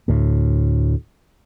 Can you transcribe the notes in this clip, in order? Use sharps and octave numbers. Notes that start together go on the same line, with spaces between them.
D2 A2